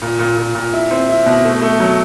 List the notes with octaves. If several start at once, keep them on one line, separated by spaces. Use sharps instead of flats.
A#2
A#2
A#2
A#2
E4
C4
E4
B2
A3
A3
F#3